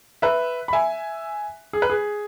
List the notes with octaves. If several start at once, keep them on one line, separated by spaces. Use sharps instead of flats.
B4 E5
B5
E5 G#5
G#4
B4
G#4